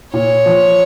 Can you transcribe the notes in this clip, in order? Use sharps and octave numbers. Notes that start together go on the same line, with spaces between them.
A#2 C#5
F3